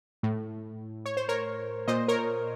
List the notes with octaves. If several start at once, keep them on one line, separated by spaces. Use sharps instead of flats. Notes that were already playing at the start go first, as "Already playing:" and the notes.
A2
C#5
C5
A#4 C#5
A#2 C5 D#5
A#4 C#5